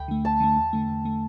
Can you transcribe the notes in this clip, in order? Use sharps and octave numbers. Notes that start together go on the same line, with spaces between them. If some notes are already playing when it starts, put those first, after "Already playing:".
Already playing: D2 G5 B5
D3 A3
D2 A5
D3 A3
E2
D3 A3
E2
D3 A3